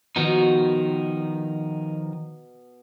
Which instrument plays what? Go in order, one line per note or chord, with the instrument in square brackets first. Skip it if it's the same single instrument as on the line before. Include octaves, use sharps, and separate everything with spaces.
[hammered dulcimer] B2 [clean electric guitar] D#3 F3 D#4